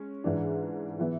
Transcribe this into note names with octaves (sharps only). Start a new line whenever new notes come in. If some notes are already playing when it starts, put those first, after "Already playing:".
Already playing: G#3 C#4
G#2 E3 G#3 D4
E3 B3 E4